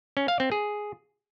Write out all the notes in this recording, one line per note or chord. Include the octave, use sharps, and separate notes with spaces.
C#4
F5
C4
G#4